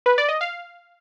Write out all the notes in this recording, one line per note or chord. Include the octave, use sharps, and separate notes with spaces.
B4
D5
D#5
F5